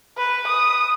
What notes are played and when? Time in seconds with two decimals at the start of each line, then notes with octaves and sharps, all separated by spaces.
0.17 B4
0.47 D#6